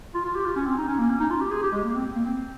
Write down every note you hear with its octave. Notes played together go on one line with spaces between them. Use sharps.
F4
F4
G4
F4
C#4
C4
D#4
C#4
A#3
C#4
D#4
F4
G4
G#4
G4
G#3
A#3
C4
A#3
C4